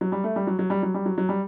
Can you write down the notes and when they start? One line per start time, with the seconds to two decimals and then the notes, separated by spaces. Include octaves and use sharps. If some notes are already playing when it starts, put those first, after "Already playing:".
0.01 F#3
0.12 G3
0.24 A3
0.36 G3
0.47 F#3
0.59 F#3
0.70 G3
0.83 F#3
0.94 G3
1.06 F#3
1.18 F#3
1.29 G3